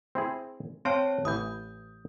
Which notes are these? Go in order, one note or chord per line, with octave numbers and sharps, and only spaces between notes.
C4 E4 G#4
C4 C5 C#5 F5 G5 A5
A1 E3 D#6 G6